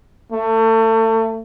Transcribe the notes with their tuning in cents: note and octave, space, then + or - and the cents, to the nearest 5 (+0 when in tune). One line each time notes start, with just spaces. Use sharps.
A3 +30